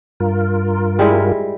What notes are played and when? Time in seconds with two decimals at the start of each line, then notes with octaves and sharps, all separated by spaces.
0.20 G2 F4 A#4
0.99 G3 G#3 E4